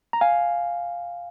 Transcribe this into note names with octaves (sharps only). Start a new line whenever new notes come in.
A#5
F5 G#5